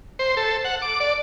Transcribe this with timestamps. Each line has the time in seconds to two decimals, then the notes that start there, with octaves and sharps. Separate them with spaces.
0.19 C5
0.37 A4
0.65 F#5
0.82 D6
1.00 D5